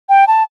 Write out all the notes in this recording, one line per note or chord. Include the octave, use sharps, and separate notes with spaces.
G5
A5